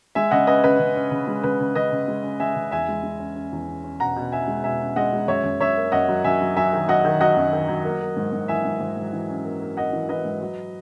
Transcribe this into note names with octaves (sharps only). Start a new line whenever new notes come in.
G#3 E5 G#5
C#3 D#5 F#5
C#4 B4 D#5
C#3 B4
C#3
C#4
C#3
G#3
C#3 B4
C#3
C#3 B4 D#5
C#3
G#3
C#4
G#3 E5 G#5
C#3
E2 E5 G#5
G#3
G#3
C#4
C#4
E2
C#4
C#4
B2 F#5 A#5
B2
C#4 E5 G#5
G#3
B2 E5 G#5
C#4
G#3 D#5 F#5
G#3
F#2 C#5 E5
F#2
F#2 C#5 E5
A#3
F#2 D#5 F#5
F#3
F#2 E5 G#5
F#3
F#3 E5 G#5
D#3
F#3 D#5 F#5
D#3
F#3 D#5 F#5
F#2
D#3
F#3
A#3
A#3
G#2
G#2
E3 E5 G#5
G#2
G#2
G#2
E3
C#4
A#3
A#3
A#3 D#5 F#5
E3
E3 B4 D#5
G#2
F#3